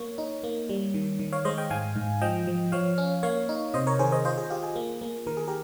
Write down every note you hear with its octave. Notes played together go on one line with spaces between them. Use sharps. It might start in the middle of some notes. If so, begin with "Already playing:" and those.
Already playing: A#3 C#5
D#4
A#3
G3
D#3
D#3
C#5 F5
G#3 C5 D#5
D#5 G5
G#2 F5 G#5
G#2
F3 D#5 G5
F3
F3 C#5 F5
C#4
A#3 C#5 F5
D#4
C3 C5 D#5
A#4 C#5
D#3 G#4 C5
C5 D#5
F4 C5 D#5
G#4
F4 G4
G#4
A#3
A#3
D#3 A#4
G#4
G4 A#4